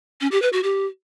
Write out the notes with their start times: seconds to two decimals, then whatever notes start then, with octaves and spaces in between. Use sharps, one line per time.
0.21 C#4
0.32 G4
0.42 B4
0.53 F#4
0.63 G4